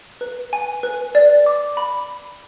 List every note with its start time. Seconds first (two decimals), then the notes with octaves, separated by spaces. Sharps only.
0.21 B4
0.53 G#5
0.83 B4
1.15 D5
1.46 D6
1.77 B5